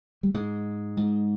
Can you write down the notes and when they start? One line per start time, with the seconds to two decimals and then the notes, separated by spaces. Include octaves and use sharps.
0.23 G3
0.34 G#2 G#3
0.97 G#2